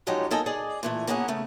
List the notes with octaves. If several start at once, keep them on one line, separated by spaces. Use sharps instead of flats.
F3 F#3 G#3 C#4 D#4 G4
A#3 D#4 A4 A#4 D#5 G#5
G#4 D5 D#5
A#2 E3 A3
A#3 B3 C#4 G#4 C#5 F#5
C#3 A3